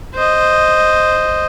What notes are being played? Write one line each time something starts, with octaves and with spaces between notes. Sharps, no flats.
C5 D#5